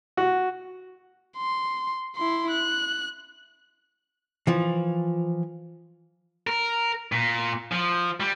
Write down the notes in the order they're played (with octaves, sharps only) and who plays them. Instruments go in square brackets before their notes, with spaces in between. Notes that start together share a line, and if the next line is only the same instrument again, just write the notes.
[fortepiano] F#4
[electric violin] C6
E4 C6
F#6
[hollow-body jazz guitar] E3 F3
[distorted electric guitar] A#4
A#2
F3
G3